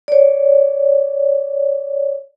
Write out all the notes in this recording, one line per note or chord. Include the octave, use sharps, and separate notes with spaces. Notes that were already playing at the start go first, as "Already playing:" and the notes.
C#5 D5